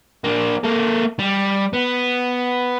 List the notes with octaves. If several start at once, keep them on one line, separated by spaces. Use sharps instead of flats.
A#3 D4
A#3 A4
G3
B3